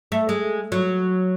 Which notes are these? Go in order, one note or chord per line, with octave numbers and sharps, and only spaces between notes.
A3
G#3
F#3